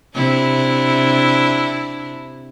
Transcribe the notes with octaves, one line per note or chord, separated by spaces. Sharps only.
C3 D4 E4